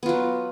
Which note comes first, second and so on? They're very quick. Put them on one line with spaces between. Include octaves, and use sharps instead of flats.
B3 F4 F#3